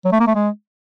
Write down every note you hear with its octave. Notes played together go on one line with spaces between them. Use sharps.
F#3
A3
A#3
A3
G#3